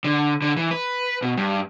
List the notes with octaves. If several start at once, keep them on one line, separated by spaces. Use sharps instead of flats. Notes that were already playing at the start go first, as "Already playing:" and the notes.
D3
D3
E3
B4
B2
G2